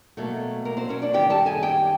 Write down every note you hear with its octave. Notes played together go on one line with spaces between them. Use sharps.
B2 F#3 A3 A#3 A4
A#3 A#4
C4 C5
C#4 C#5
D4 D5
F#2 D#3 G3 C4 G4 G5
A4 A5
G#4 G#5
G4 G5